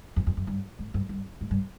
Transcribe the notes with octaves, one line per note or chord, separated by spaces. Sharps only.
F2
F2
F#2
G2
G#2
G2
G2
G#2
G2